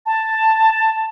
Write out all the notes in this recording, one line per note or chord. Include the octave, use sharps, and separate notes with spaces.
A5